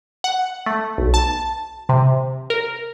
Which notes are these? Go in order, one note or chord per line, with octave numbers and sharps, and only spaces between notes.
F#5
A3
B1
A5
C3
A#4